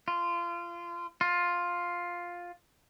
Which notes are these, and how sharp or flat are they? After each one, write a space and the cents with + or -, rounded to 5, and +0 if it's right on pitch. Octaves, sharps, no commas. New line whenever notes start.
F4 -25
F4 +5